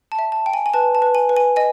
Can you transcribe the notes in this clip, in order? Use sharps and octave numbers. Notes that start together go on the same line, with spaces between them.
A5
E5
A5
G5
G#5
G#5
B4 A5
A5
B4
G#5
B4
G#5
D#5 G#5